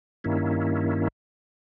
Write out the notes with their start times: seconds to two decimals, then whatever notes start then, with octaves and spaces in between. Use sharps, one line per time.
0.24 G2 D#3 A#3 C#4 E4